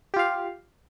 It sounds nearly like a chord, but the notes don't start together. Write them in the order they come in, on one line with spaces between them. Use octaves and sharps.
G4 F4 F5